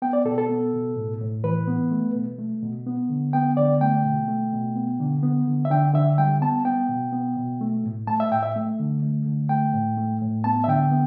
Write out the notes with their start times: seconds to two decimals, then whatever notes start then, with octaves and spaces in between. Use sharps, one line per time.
0.02 B3 G5
0.13 D5
0.25 B2 A4
0.38 A4
0.49 B3
0.73 B2
0.96 A2
1.21 A2
1.44 E3 B4
1.67 B3
1.91 A3
2.15 B2
2.39 A3
2.62 B2
2.87 B3
3.09 D3
3.33 B3 G5
3.57 D3 D5
3.81 A3 G5
4.04 B2
4.28 A3
4.53 B2
4.75 B3
5.00 D3
5.23 B3
5.47 D3
5.65 E5
5.70 D3 G5
5.94 D3 E5
6.18 G3 G5
6.41 B3 A5
6.65 B3 G5
6.89 B2
7.12 B3
7.36 B2
7.61 A3
7.84 A2
8.07 A3 A5
8.20 E5
8.32 A2 G5
8.43 E5
8.56 A3
8.79 D3
9.03 A3
9.26 D3
9.49 A3 G5
9.74 A2
9.97 A3
10.22 A2
10.44 B3 A5
10.64 E5
10.68 D3 G5
10.92 B3